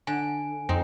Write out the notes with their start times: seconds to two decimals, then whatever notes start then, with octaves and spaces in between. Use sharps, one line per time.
0.07 D3 G#5
0.69 F2 C4 D#4